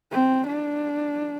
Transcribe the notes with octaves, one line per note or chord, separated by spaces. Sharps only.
C4
D4